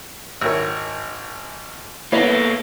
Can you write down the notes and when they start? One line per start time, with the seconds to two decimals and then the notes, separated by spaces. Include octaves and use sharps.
0.41 G#1 E4 A#4 C#5 E6
2.12 A#3 B3 E4 A4 C#5 E5